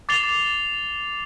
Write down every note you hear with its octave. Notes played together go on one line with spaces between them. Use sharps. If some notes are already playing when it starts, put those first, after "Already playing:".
D6 A6 C7 F7 G7